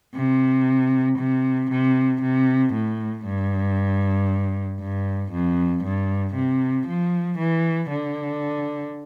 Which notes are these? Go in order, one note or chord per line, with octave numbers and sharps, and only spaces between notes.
C3
C3
C3
C3
A2
G2
G2
F2
G2
C3
F3
E3
D3